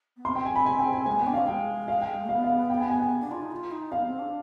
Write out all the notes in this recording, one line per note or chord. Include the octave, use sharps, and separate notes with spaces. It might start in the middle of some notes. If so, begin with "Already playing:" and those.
B3
C4 C6
G5
G#5
B5
G#5
G5
G#5
G#3 G#5
B3 G5
D4
C4 F5
G#3 G5
F5
G5
B3 F5
F5
G5
G#5
G#5
G5
D4
F4
D#4
F4
D#4
B3 F5
C4
D4